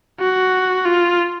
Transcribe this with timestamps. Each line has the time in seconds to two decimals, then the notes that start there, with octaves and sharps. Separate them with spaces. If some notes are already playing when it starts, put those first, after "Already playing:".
0.20 F#4
0.85 F4